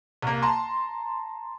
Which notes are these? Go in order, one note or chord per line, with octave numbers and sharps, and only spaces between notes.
C2 A#3
A5 A#5 C6